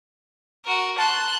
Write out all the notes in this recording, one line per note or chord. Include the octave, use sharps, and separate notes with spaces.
F#4 A#4
A5 C6 F#6